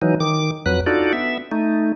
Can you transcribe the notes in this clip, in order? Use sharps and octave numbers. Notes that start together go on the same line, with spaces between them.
E3 F#3 D#4
D#3 D6
F2 F#3 B4 F#6
D4 D#4 F4 F#4 A4 D5
B3 E5
A3 D#4